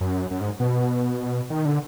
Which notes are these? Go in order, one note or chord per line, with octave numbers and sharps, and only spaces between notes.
F#2
F#2
G#2
B2
D#3
D3